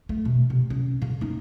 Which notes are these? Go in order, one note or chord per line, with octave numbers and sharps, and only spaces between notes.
A3
B2
C3
C#4
C#3
A#3 D#4